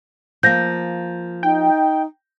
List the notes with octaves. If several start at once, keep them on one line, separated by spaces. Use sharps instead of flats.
F3 A#3 G6 A#6
D#4 G5